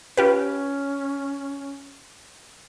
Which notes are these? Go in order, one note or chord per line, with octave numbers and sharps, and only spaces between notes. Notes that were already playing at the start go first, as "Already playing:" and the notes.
C#4 F4 G4 B4